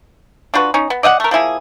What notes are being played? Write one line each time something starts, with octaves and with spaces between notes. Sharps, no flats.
D4 F4 F#4 B4
C#4 D#4
B3
D5 D#5 F5 F#5
A3 A#4
F3 A#3 E4 G#4